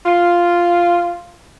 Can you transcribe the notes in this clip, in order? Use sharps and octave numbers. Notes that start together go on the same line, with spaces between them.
F4